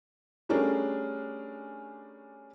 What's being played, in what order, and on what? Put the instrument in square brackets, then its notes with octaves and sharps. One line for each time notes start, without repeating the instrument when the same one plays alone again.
[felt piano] G3 A3 C#4 D4 G#4 A#4